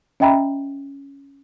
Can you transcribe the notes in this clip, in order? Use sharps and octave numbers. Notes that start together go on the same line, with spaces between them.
C#4 D#5 E5 G5 A#5 B5